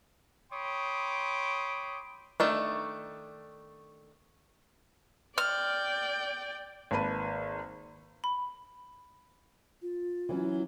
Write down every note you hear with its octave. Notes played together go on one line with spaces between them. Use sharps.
C#5 G5 B5 C6 D6 D#6
D#3 A3 D4
D5 G5 F6
G#1 A#3 B4 A5 B5 D#7
B5
F4
E3 F#3 C#4